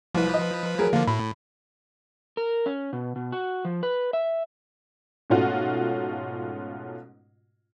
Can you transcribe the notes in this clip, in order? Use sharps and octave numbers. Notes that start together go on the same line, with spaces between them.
C2 F3 B4
D#5
F#3 G#4 A#4
D3 F3 A#3
A2 B5
A#4
C#4
B2
B2
F#4
F3
B4
E5
G#2 B2 A3 C#4 F4 F#4